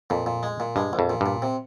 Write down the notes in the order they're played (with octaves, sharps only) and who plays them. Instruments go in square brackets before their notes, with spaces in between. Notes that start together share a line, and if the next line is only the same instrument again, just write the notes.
[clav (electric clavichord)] F2 [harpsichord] A#2
[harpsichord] A#2
G#3
A#2
[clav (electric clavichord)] G2 [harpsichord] G#3
[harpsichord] A#1
[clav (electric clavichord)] F2
[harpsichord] A#2
[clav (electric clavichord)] G2 [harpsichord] A#2
[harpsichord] C3